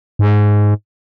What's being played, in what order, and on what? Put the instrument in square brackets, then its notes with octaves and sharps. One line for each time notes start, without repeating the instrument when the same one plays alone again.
[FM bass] G#2